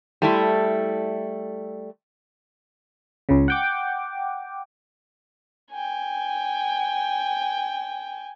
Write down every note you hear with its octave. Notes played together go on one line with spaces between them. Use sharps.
G3 A3 E4
C#2 C#3
F#5 G5 D6
G5 G#5